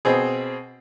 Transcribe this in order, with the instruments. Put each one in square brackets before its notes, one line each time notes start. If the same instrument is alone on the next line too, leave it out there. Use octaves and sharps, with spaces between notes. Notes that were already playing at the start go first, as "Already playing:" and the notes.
[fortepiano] B2 C4 G#4